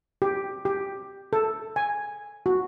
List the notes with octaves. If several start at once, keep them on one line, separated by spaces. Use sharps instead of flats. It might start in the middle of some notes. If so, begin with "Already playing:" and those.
G4
G4
A4
G#5
F#4